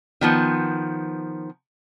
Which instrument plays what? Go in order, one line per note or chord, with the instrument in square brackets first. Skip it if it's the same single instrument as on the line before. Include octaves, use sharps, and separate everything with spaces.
[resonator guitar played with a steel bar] D#3 F3 B3